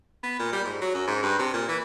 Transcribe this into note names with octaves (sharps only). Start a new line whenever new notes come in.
B3
A#2
G3
G#2
F#3
F#2
G#2
G2
C3
A#2
E3